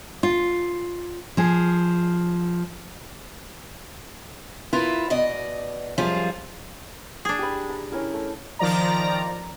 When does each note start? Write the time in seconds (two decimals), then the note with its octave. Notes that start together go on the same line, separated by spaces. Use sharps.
0.23 F4
1.37 F3 G#4
4.73 E4 F4 A#4 B4
5.10 B2 D5 D#5
5.98 F#2 F3 G3 F4 G#4
7.25 D4 G#4
7.39 G4 B5
7.69 A#5
7.92 C#4 E4 A#4
8.13 A3
8.59 D#3 F3 D5 A#5